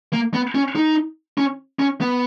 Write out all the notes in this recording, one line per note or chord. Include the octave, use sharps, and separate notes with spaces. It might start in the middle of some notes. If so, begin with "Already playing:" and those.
A#3
B3
C#4
D#4
C#4
C#4
B3